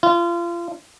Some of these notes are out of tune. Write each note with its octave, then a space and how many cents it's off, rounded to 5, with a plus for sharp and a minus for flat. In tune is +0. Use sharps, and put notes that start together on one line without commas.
F4 -30